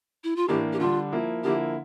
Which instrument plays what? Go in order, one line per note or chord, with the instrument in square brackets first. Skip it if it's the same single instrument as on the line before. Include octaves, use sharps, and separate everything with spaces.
[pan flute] E4
F4
[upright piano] A2 E3 A#3 D4 [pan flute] G4
[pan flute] G4
[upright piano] D3 G3 D4 [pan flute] F4
[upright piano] F3 A#3 E4
[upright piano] D3 F3 A#3 E4 [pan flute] G4